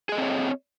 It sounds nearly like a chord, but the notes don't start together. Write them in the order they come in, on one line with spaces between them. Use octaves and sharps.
G#4 D#5 A4 C4 C#5